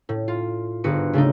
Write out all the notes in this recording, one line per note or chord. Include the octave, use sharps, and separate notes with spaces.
A2
F4
G1 G#2 F#4 B4 C#7
C#3 A3 D4 D#4